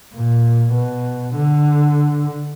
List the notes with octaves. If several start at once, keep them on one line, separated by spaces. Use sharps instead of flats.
A#2
B2
D3